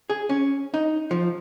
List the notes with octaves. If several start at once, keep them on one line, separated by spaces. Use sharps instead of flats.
G#4
C#4
D#4
F3